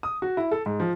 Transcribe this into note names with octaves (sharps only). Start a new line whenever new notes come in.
D#6
F#4
E4
A4
G#2
F3